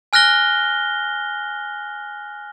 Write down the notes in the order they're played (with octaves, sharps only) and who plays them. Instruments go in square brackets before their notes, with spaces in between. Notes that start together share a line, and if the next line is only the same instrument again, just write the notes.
[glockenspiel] G#5 F6 F#6 A#6 G7